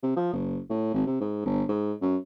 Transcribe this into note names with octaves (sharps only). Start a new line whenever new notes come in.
C3
F3
F#1
A2
G#1
C3
G#2
G1
G#2
F#2